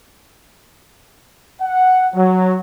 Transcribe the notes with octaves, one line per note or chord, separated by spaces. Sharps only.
F#5
F#3